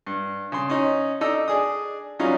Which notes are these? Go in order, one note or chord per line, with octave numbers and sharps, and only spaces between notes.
G2
C#3 C6
C#4 D#4
D4 D#4 A4 D#5 E6
D4 G#4 D#6
F#3 G3 C#4 D#4 F4